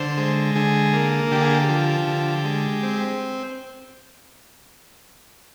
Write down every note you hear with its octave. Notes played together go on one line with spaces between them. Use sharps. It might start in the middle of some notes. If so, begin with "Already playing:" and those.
Already playing: D3 C5
G#3
D3 G#4
A#3
D3 G4
G#4
G4
F3
D3
G#3
C4